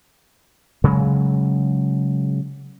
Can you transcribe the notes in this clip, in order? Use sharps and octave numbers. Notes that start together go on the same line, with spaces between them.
C#3 F#3 G#3